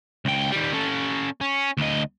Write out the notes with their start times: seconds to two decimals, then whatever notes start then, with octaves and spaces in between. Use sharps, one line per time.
0.25 C#2 G5
0.52 D#3 G3
0.73 C#4 A4
1.41 C#4
1.77 D2 D#5